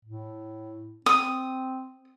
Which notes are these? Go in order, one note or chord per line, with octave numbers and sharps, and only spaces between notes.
A2
C4 D#6